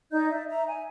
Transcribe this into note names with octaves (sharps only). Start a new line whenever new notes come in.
D#4 D5 D#5 G6
D5 E5
E5 A#5
G#5